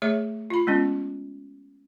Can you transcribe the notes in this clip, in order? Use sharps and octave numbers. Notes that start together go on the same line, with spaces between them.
A3 G#4 C#5 E5
F4 B5
G#3 B3 C#4 F4